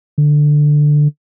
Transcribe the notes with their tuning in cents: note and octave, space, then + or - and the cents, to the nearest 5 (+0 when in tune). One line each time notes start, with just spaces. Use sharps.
D3 +10